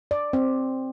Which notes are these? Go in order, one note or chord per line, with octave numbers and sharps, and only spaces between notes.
D5
C4